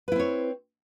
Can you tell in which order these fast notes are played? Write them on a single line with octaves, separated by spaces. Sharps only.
B4 E4 C4 C#5